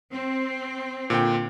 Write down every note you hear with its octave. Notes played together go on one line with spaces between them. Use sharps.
C4
A#2 D3 G5